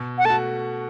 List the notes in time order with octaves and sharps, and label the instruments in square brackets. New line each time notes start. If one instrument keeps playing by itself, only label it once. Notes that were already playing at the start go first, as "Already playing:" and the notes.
Already playing: [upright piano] B2
[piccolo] F#5
[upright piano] A3 F#4 [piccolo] A5